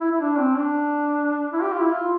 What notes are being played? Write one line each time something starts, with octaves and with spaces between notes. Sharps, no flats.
E4
E4
D4
C4
D4
E4
G4
F4
E4
F4